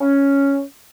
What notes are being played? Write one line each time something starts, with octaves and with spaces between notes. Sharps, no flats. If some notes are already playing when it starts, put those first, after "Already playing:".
C#4